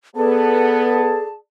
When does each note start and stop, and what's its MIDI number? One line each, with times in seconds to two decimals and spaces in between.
0.16 1.21 59
0.16 1.35 68
0.16 1.24 69
0.16 1.35 74
0.16 1.35 81